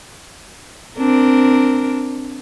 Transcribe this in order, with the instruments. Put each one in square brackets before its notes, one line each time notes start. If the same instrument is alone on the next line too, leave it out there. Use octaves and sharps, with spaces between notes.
[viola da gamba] C4 D4 A#4